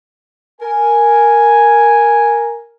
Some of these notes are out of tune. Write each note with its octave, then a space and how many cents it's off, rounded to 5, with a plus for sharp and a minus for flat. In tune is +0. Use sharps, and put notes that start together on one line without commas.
A#4 +0 G#5 +0